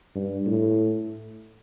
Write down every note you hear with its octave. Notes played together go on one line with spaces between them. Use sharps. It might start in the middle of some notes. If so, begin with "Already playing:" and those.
G2
A2